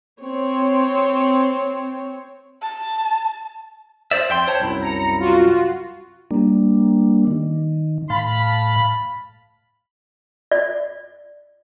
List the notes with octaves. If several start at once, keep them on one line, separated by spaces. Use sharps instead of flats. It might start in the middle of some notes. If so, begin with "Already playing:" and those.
C4 C#5
A5
C5 D5 E5
F2 G5 C6
C5 C#5 A5
C2 F#2 E4
A#5 C#7
F4 F#4
G3 A#3 D4
D#3
A2 F5 A5 B5
D5